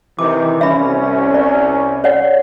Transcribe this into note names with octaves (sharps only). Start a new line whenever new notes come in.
C3 D#3 E3 D6
C2 C#4 E5 B5
D5
C#5 D5 F#5